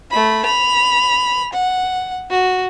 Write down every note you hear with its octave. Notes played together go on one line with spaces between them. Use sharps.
A3 B5
B5 F7
F#5
F#4